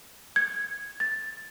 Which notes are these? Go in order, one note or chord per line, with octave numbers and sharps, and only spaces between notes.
G#6
A6